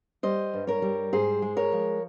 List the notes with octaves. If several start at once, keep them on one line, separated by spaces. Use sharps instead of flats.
G3 C5 D#5
G2
A#4 C#5
G3
G#2 G#4 C5
G#3
A#4 C#5
F3